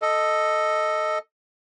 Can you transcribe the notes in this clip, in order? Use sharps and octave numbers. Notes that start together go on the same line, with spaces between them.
A4 D#5